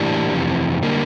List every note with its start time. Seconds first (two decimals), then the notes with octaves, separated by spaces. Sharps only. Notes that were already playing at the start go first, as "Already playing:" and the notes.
Already playing: A2 E3 A#3 D4 E4 G4
0.34 F2 C3 E3
0.83 D3 G3 A#3